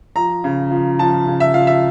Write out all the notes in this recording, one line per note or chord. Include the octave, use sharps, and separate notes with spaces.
F3 A#5
C#3
F3
F3 A5
C#3
E5
F3 F5
E5